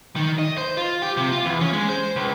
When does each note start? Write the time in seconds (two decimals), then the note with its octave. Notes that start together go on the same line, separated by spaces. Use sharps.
0.16 D#3
0.39 D#5
0.58 C5
0.77 F4
1.02 G4
1.17 C3
1.32 F4
1.45 E2
1.61 C#4
1.73 G#3
1.89 C5
2.16 C#2